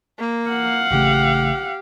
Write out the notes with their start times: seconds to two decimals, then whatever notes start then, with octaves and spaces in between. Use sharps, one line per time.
0.19 A#3
0.50 F5 F#5
0.91 A1 C#3 A3 G4